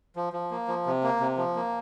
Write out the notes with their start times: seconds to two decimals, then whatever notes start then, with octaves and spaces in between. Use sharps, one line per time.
0.16 F3
0.33 F3
0.51 A#3
0.68 F3
0.86 C3
1.03 A#3
1.21 C3
1.37 F3
1.56 A#3